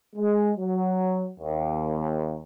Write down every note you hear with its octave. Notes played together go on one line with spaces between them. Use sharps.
G#3
F#3
D#2